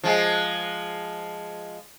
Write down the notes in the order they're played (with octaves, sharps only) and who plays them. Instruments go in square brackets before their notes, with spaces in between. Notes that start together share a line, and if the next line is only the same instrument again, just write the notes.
[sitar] F3 G#3